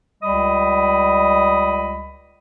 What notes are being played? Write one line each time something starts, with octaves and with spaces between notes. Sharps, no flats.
C#2 G3 D#5 B5